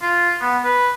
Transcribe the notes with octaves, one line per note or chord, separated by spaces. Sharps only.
F4
B3
B4